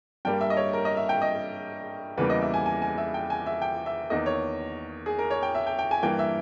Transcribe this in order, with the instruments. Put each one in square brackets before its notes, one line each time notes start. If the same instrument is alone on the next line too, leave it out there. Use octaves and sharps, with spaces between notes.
[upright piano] G2 G3 A#3 G5
E5
D#5
C#5
A#4
D#5
E5
G5
D#5
E2 C#3 E3 G3 A#3 B4
D#5
E5
G#5
G#5
G#5
E5
G5
G#5
E5
G5
E5
E2 D#3 A#3 D#5
C#5
G#4
A#4
C#5
G5
E5
G5
G5
G#5
G2 E3 A#3 G5
E5